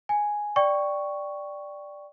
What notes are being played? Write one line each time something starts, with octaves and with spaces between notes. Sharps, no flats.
G#5
D5 G5 C#6